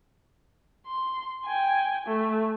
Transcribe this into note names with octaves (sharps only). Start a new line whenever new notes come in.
C6
G5 G#5
A3